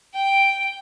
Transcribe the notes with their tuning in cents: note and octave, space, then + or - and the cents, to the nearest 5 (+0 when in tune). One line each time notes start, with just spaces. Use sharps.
G5 +0